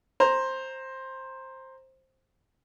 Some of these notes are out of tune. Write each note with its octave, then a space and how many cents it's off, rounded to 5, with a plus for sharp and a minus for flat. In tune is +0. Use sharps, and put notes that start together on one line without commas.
C5 +10 A#5 +0